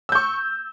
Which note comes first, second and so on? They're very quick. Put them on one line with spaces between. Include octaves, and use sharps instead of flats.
E6 G6 C#6